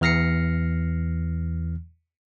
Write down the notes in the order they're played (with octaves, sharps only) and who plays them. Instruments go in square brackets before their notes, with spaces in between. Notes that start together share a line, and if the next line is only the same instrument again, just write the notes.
[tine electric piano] E2 E3 F6 A#6 C7 C#7